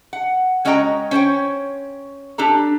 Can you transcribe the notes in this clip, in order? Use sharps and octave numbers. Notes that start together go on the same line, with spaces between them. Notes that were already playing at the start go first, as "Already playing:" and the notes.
F#5
G#3 C#4 F#4 D#5 G5 A#5
C#4 C5 C#5 G5
D4 G4 A4 A#5